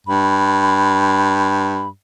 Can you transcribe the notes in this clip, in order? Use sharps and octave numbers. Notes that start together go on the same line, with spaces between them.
G2 B5